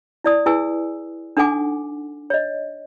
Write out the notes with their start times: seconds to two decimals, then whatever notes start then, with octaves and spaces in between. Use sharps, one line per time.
0.24 E4 D5 D#6
0.46 E4 G#4 B4 G#5 E6
1.37 D4 D#4 A4 F#5 G#5 D6
2.30 C#5 D#5